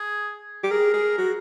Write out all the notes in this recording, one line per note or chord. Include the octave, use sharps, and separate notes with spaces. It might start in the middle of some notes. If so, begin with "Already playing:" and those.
Already playing: G#4
G4
G#4 A#4
G#4
F#4